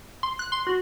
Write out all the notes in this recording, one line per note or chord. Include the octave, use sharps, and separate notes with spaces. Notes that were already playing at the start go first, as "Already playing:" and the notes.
C6
F#6
C6
F#4